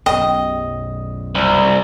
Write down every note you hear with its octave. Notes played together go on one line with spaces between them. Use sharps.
B1 F#2 B3 D#5 G5
C2